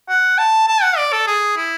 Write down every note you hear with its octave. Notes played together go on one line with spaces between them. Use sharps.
F#5
A5
A5
F#5
D5
A4
G#4
E4